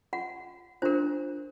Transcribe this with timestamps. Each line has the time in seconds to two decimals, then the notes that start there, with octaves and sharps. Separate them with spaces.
0.13 F4 F#5
0.82 D4 F4 A#4 C5